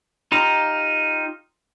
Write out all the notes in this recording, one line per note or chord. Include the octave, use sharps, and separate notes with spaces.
D#4 F4 G4 A#5